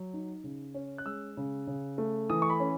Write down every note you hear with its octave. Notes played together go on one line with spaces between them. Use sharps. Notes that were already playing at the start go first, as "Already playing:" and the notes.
Already playing: F#3
D#4
C#3
C#4
F#6
G#3 E6
C#3
C#3
A3
E3 D#6
C#6
B5
C#4